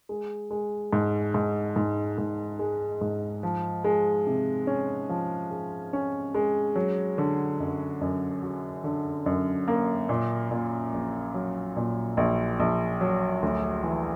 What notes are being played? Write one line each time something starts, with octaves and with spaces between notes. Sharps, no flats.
G#3
G#3
G#2
G#2
G#2
G#2
G#3
G#2
F3
G#3
C3
C#4
F3
G#3
C#4
G#3
F#3
D3
F#2
F#2
F#3
D3
F#2
A#3
A#2
A#2
A#1
F#3
A#2
A#1
A#1
F#3
D2
E3